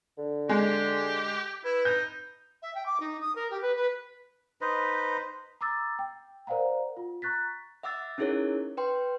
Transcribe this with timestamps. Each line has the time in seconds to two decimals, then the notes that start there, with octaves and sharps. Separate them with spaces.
0.18 D3
0.49 G#3 G4
1.64 E4 B4
1.85 D#4 G6
2.62 E5
2.75 G5
2.86 D6
3.00 D#4
3.21 D#6
3.35 A#4
3.51 G4
3.62 B4
3.76 B4
4.61 D#4 B4 C5 D#5
5.61 A#5 D6 E6 A6
5.99 G5
6.47 A#4 C5 D5 F5 F#5 A#5
6.97 F4
7.22 A#5 C#6 F#6 A6 B6
7.83 E5 F#5 D6 E6 A6
8.18 C#4 D#4 E4 G#4 A#4 C#5
8.77 B4 G5 C6